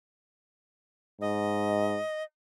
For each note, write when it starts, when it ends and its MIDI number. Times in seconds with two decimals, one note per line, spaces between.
1.21 1.98 44
1.21 2.23 75